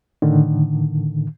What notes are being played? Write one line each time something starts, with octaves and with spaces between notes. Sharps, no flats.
A2 D3 D#3